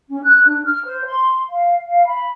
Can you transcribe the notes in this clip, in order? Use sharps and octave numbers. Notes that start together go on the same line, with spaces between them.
C#4
F#6
D4
F6
C5
C6
F5
F5
B5